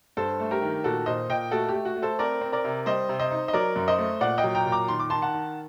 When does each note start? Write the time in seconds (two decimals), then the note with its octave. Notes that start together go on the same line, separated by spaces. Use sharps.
0.17 G2 A4 C5
0.40 A3
0.51 G4 A#4
0.62 D#3
0.84 A#2 F#4 A4
1.06 A#2 C5 D#5
1.29 A#2 D#5 G5
1.51 A3 F#4 A4
1.69 G4
1.74 A3
1.85 F#4
1.96 A3
2.02 A4 C5
2.19 C4 A#4 D5
2.41 C4
2.52 A#4 D5
2.65 C3
2.86 G3 C5 D#5
3.09 C3
3.19 C5 D#5
3.31 D#4
3.48 D#5
3.53 F#3 A#4 D5
3.76 F#2
3.88 C5 D#5
3.98 A3
4.21 A#2 D5 F#5
4.38 D#5 G5
4.44 F#3
4.55 G5 A#5
4.66 A#2
4.72 A#5 D6
4.88 D#3 C6
5.00 D6
5.10 D#3 A5 C6
5.22 F#5 A5
5.34 D#3